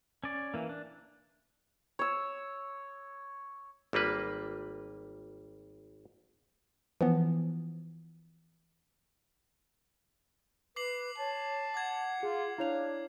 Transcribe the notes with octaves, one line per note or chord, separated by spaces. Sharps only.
C#4 D5
E3 A#3
D4
C#5 E6
G#1 G3 A#3 B4
E3 F3 B3
B4 D6 C7 F#7
C#5 A5
F#5 D6 G#6
F4 G#4
D4 E4 C#5 F5 F7